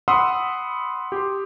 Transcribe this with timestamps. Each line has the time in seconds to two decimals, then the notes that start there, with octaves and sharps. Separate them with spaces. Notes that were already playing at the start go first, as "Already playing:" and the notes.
0.08 F#5 B5 C6 D#6 E6
1.12 G4 C6